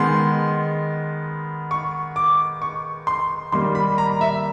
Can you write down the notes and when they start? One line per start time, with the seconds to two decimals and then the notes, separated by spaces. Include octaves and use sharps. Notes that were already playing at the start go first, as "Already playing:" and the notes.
Already playing: D#3 G#3 B3 C6
1.71 C#6
2.16 D6
2.62 C#6
3.07 C6
3.52 D#3 G3 A#3 C6
3.75 B5
3.98 A#5
4.21 E5